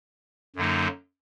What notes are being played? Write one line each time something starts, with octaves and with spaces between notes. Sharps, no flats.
F#2 D3 F#3 A#3 D#4